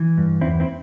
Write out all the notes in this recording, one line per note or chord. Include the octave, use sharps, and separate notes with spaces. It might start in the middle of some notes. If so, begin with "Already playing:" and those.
Already playing: E3
G2
E2 C4 E4
C4 E4